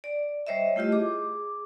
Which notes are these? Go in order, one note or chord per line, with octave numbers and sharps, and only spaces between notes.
D5
G3 C5 C#5 D#5 E5
A3 E4 F4 G4 D#5
G#4 D6